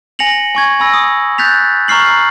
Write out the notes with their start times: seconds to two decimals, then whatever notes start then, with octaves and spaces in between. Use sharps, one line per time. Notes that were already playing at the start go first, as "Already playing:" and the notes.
0.19 G#5 A#6 C#7 F7 F#7
0.55 G#5 C#6 G#6
0.80 G#5 B5 E6 A#6
0.94 D#6
1.38 F#6 G6 A6 B6 F7
1.88 A#5 C#6 F6 C7 F#7